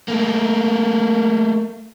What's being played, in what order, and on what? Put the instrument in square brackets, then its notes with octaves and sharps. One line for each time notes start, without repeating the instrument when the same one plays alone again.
[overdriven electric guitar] A3 A#3